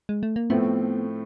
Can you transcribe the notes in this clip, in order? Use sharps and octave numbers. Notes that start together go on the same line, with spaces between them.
G#3
A3
A#3
A2 F3 A3 B3 C4